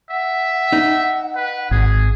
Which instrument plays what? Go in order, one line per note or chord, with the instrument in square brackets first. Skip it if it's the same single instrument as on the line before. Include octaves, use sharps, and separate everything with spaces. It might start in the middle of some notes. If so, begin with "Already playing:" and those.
[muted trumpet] E5 [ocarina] F#5
[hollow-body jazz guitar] D#4
[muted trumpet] B4
[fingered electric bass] G#1 [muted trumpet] G#4